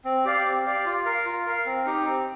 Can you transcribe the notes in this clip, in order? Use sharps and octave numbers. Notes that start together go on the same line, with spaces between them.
C4
G4 D5 F5
C4
G4 D5 F5
F4
A#4 F5
F4
A#4 F5
C4
D#4 G4
C4